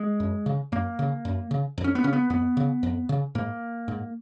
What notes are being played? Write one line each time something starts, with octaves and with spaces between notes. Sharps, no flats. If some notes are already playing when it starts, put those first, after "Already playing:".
Already playing: G#3
F#2
C#3
F#2 A#3
C#3
F#2
C#3
F2
C#4
B3
C#3 C#4
B3
F2 B3
C#3
F2
C#3
G#2 A#3
G#2